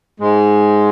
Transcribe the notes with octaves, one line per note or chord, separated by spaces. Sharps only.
G#2 G#3